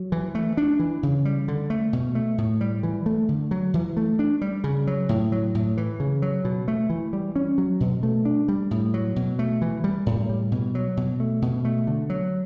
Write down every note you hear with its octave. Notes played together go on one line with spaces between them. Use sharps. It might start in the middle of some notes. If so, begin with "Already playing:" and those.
Already playing: F#3
E3
A3
D4
E3
C#3
G3
D3
A3
B2
A3
A2
G3
E3
A3
D3
F#3
E3
A3
D4
G3
C#3
F#3
A2
F#3
A2
E3
C#3
F#3
B2
A3
E3
G3
C#4
F#3
B2
A3
D4
G3
A2
F#3
B2
A3
E3
G3
A2
G3
B2
F#3
B2
A3
B2
A3
D3
F#3